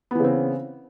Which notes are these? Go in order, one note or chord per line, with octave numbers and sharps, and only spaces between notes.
C#3 E3 B3 C4